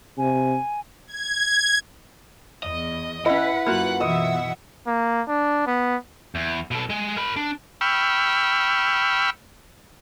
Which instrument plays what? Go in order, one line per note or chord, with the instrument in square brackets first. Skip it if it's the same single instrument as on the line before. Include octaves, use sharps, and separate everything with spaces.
[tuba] C3 [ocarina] G#5
[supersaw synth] G#6
[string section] E2 [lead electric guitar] D#5
[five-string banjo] C#4 D#5 [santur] E4 [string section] B4 [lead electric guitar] F#5
[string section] F#2 B4 F#6 [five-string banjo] A#3 F4 F#4
[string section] B2 E3 E5 [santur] D#5 E6
[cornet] A#3
D4
B3
[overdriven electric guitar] E2
B2 A4
G#3 G#5
A#4 B5
D4
[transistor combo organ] G5 B5 C#6 E6 F6